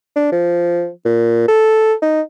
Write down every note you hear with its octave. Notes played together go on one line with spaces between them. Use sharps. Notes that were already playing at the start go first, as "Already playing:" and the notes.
D4
F3
A#2
A4
D#4